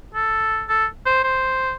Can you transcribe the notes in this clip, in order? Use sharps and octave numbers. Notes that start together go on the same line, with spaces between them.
A4
A4
C5
C5